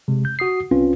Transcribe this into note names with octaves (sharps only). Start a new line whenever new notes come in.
C3 G#3
G6
F#4 D#6 C7
C2 C4 C#4 F4 B4